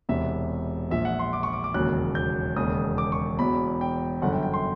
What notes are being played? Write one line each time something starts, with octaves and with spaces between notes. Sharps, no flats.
E1 E2 C3 E5
A#1 A#2 F3 E5
F#5
C6
D6
C#6
D6
D6
E1 D#2 C#3 F#3 F#6
G6
E1 D#2 C#3 D#6
D6
C#6
E1 E2 B2 F#3 B5
G5
G1 F#2 D3 F#5
G5
G5
C6